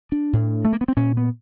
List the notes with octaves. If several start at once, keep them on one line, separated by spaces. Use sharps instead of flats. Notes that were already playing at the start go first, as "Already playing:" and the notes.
D4
A2
A3
A#3
B3
C4
A#2 C#4
B3